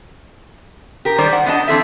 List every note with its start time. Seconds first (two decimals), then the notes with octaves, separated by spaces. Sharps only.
1.05 G4 A#4
1.18 D#3 G3 G#4 C5 D5
1.30 D5 F#5
1.46 B3 D4 D#5 A5
1.68 E3 C4 A4 E5